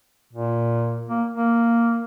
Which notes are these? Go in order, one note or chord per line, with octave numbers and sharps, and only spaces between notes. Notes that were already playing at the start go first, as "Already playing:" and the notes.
A#2
A#3
A#3